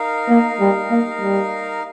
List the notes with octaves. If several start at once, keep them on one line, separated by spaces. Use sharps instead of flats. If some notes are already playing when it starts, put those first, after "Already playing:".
Already playing: D#4 A#4 F5
A#3
G3
A#3
G3